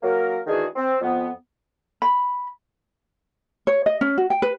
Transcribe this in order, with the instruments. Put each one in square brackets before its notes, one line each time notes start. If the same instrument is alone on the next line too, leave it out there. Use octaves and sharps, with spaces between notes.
[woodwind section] F#3 A#3 A#4
D#3 E3 G#3 D4 F#4 G#4
C4
F2 B3
[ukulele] B5
C#5
D#5
C#4
F#4
G5
B4